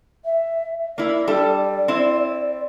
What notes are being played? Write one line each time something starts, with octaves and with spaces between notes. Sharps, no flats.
E5
A#3 E4 D5
G3 D4 A4
C4 E4